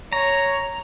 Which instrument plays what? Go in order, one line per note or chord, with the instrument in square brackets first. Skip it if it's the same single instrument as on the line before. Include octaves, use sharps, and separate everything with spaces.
[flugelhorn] C#5 [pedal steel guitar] A#5